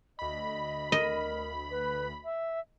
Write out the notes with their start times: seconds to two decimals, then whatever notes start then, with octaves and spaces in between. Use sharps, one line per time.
0.19 D2 D#5 B5
0.92 A#4 D#5
1.71 B4
2.24 E5